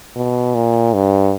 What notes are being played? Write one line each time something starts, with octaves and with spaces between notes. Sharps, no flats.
B2
A#2
G2